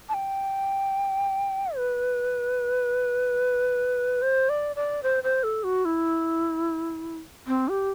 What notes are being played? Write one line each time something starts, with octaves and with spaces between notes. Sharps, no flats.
A5
G5
B4
C5
D5
D5
C5
C5
A4
F#4
E4
C4
G4